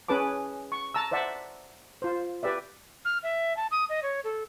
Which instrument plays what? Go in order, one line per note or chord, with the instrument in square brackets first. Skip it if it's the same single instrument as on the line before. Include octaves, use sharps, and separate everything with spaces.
[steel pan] C#4 G#4 B4 A5 D6
C#6
A5 A#5 E6
C5 D5 E5 F#5 A5
F4 C5
G4 B4 D5 E5
[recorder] F6
E5
A5
D#6
D#5
C#5
A4